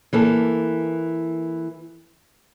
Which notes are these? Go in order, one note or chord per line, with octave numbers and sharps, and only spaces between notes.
E3 A#3 A4